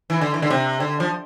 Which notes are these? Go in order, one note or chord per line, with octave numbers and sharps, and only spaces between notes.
E3
D3
E3
D3
C3
D3
F3